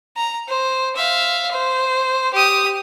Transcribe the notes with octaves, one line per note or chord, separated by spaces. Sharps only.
A#5
C5
E5 F5
C5
G4 D#6